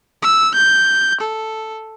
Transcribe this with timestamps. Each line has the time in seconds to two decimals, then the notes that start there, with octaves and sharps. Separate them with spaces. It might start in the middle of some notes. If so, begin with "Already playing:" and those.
0.22 E6
0.54 G6
1.21 A4